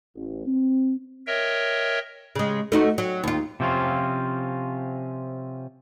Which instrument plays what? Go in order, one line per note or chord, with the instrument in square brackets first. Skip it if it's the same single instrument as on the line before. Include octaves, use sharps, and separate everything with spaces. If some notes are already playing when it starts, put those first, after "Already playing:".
[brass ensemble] A1
C4
[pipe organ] A#4 C#5 D#5 E5 G5
[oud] C#3 G#3
A3 D#4 F#4
F#3
D#2 F4
[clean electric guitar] C3 F3 C4 C#4 F4